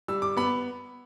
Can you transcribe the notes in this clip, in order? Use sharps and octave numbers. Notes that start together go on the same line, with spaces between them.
G3 E6
D6
B3 B5